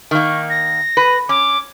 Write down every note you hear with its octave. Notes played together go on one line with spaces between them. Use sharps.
D#3 A#3 C#6
A#6
B4
C#4 D6